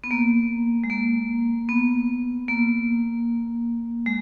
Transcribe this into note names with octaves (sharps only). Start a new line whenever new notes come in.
B3
A#3
G#3
A#3
B3
A#3
G#3